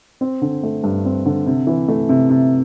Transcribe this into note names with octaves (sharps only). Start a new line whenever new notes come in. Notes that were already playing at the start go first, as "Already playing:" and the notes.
C4
D3
A3
G2
C4
D3
C3
E3
A3
C3
C3